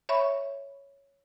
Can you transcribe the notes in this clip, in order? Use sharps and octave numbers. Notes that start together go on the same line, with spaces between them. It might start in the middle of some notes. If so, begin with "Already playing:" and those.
C#5 E5 B5 C#6